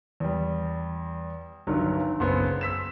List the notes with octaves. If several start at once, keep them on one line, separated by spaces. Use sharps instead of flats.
E2 G3
G1 G2 D#3 F#3
F#1 B3 C5
E6 B6 E7